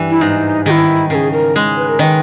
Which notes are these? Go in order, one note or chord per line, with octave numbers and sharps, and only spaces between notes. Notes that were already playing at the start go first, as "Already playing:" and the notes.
Already playing: G2 E3
E4
G#2 D#4
D#3 E4 G#4
C#3 G#4 A#4
A#4
G#3
B4
A#4
D#3 B4 D#5